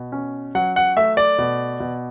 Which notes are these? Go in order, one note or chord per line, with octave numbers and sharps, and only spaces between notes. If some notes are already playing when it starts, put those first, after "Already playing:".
Already playing: B2
C#4
F#3 F#5
F#5
A3 E5
D5
B2
B2